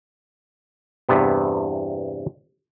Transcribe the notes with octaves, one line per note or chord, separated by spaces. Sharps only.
E2 G2 C3 B3